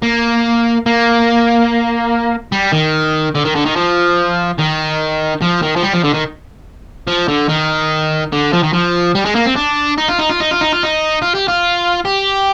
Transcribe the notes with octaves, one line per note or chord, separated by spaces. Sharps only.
A#3
A#3
G3
D#3
D3
D#3
D3
D#3
F3
D#3
F3
D#3
F3
G3
F3
D3
D#3
F3
D3
D#3
D3
F3
D#3
F3
G3
G#3
A#3
C4
D4
D#4
F4
D#4
F4
D#4
F4
D#4
F4
D#4
F4
G4
F4
G4